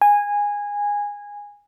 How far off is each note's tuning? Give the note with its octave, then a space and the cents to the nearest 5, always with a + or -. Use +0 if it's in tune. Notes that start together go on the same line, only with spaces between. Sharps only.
G#5 -15